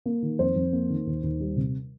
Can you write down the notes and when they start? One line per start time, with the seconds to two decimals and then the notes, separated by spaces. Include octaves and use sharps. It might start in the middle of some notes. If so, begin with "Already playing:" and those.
0.06 A#3
0.22 D#3
0.39 F2 C5
0.56 F2
0.73 A#3
0.90 D#3
1.06 D#2
1.23 D#2
1.40 G3
1.56 C3